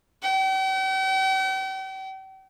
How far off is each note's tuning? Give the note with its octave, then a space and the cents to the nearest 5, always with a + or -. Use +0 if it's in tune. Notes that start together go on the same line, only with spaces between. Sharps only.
G5 -45